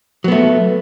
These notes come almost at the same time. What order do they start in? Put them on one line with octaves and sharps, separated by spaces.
F#3 B3 A3